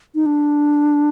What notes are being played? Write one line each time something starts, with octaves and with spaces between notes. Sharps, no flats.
D#4
D4